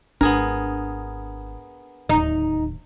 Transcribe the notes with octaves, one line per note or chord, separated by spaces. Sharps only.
G#1 B3 D4 G#4 A#4
D1 D#2 D#4